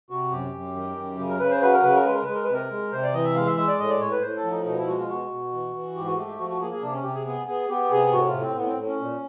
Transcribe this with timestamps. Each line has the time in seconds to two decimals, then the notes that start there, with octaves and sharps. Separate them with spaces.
0.10 C3 F#4
0.31 F#2 G4
0.54 F#2
0.76 D#3
0.97 F#2
1.18 C#3
1.30 A#4
1.40 C#3 B4
1.51 C5
1.62 F#3 B4
1.73 A#4
1.83 C#3 B4
1.95 A#4
2.04 G#3 B4
2.14 A#4
2.24 G#3 B4
2.35 A#4
2.44 C3 B4
2.54 A#4
2.71 G#3
2.92 C3 C5
3.03 D5
3.14 E3 D#5
3.24 E5
3.35 G#3 F5
3.46 E5
3.57 G#3 E5
3.68 D5
3.79 A2 D#5
3.89 D5
4.01 A2 C#5
4.11 B4
4.22 A2 C5
4.37 A4
4.44 F3
4.51 D#4
4.65 B2 D#4
4.77 E4
4.87 G#3 F#4
4.99 F4
5.09 B2 F#4
5.31 B2
5.52 E3
5.74 E3
5.95 G#2 G4
6.06 F#4
6.17 A3 G4
6.28 G4
6.39 F3 F#4
6.49 F#4
6.61 A#3 G#4
6.71 G#4
6.82 C3 D4
6.93 C#4
7.03 C3 G4
7.14 G#4
7.26 B3 G#4
7.47 B3 G#4
7.69 B3 G4
7.91 C3 G#4
8.13 A2 F#4
8.27 F4
8.34 A2
8.41 C4
8.56 A2 B3
8.67 C4
8.77 A2
8.88 C#4
8.99 A#2